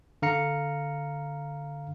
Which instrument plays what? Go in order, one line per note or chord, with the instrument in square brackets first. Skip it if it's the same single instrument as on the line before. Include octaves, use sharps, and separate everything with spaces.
[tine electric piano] D3 F5 A#5 C#7